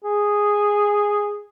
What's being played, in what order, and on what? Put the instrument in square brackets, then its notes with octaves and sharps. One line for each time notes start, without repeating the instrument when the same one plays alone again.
[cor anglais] G#4